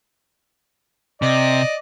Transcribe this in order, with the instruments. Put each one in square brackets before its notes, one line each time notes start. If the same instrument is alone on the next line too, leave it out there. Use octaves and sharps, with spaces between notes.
[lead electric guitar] C3 [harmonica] D5 D#5